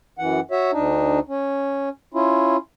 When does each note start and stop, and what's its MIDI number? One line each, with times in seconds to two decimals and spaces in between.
0.18 0.40 42
0.18 0.40 52
0.18 0.40 78
0.51 0.71 66
0.51 0.71 73
0.51 0.71 76
0.72 1.19 38
0.72 1.19 62
0.72 1.19 63
1.29 1.89 61
2.14 2.57 61
2.14 2.57 64
2.14 2.57 65